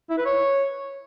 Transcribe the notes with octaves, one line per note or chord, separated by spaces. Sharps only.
E4
B4
C#5